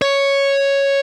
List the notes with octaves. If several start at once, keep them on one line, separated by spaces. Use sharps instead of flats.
C#5